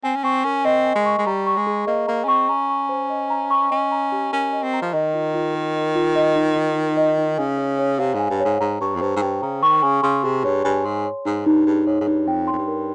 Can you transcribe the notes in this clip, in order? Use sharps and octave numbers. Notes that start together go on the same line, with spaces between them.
C4 G#5
C#4
C4 C#6
C#4 A#4
C4 D#5
G#5
G#3
C#6
G#3
G3 A#5
C#6
G#3
G#4
A#3 D#5
A#3 A#5
C#4
C4 C#6
C#4 A#5
C#6
C5
D#5
A#5
C#6
C#4 D#5
A#5
G4
C#4 A#4
D#5
C4
A#5
F3
D#3 D#5
F4
F4
A#4
D#5
F4
D#5
D#4
D#4
A#4
D#5
D#4
C#3 G#5
C#5
C#5
C3 F5
G#2
G#5
G2
G#2 C#5
G#2 A#5
G2 C#6
F2
G2 C5
G#2
G2 G5
C#3 A#5
D#3 C#6
C#3 G#5
C#3 C6
C3 G#4
G2 C#5
G2 G#5
G#2 C6
C#5
G#2 D#4
G2 D#4
G2 G#4
G#2 C#5
G#2
G2 D#4
F2 G5
C6
F2
G2
A#4